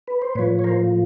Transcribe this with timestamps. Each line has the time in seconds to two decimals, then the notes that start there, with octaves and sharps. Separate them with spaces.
0.07 B4
0.22 C5
0.35 A2 F3 B4 C#5
0.59 C#5
0.64 A#4 C5